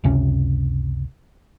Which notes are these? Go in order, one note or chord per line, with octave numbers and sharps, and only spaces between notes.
F#1 C#2 C3 C#4